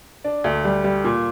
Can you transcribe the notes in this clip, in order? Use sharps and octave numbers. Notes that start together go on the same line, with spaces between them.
D4
D2
G3
G3
A#2